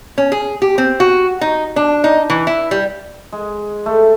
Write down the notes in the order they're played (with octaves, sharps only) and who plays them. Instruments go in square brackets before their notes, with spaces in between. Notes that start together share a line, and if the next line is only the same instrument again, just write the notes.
[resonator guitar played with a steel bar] C#4
G#4
G4
C4
F#4
D#4
D4
D#4
E3
E4
G3
[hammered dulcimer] G#3
A3